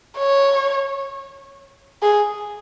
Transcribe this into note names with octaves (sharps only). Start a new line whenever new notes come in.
C#5
G#4